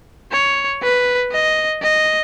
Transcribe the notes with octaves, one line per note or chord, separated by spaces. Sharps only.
C#5
B4
D#5
D#5